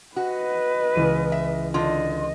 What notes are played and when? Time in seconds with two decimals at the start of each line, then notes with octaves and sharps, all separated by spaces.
0.16 F#4 B4 D#5
0.95 C#2 E3 D#7
1.32 E5
1.74 D3 F4 D#5